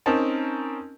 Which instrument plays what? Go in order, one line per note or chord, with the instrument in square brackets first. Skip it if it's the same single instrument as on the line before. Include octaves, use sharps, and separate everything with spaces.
[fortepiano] C4 C#4 D#4 A#4 A5